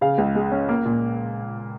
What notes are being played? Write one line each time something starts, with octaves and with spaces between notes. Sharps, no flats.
C#3 F5
C#2
G#3
C#4
A#3
A#2